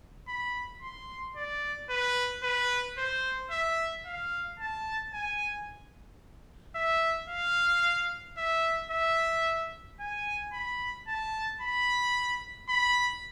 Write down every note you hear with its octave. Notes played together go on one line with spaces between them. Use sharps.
B5
C6
D5
B4
B4
C5
E5
F5
A5
G#5
E5
F5
E5
E5
G#5
B5
A5
B5
B5